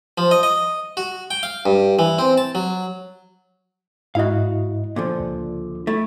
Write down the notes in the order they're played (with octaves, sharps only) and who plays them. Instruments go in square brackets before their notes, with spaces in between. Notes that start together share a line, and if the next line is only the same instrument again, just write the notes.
[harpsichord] F3
D#5
D#5
F#4
G5
F5
G2
E3
C4
A5
F#3
[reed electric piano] G#2 E4 D#5 [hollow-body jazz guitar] F#4 F5
[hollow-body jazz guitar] A#2 D3 F3
[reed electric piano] C#2
[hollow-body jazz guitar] A3 E4